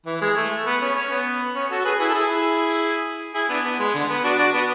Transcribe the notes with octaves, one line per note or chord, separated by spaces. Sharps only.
E3
G#3
A3
B3
C#4
C#4
B3
C#4
F#4 A4
G#4 B4
E4 G#4
A4
E4 G#4
E4 G#4
B3 D4
B3
G#3
D3
B3
D4 F#4
D4 F#4
B3